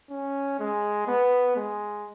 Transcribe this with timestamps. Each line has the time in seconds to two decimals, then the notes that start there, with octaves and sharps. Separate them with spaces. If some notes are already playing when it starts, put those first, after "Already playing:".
0.11 C#4
0.60 G#3
1.07 B3
1.56 G#3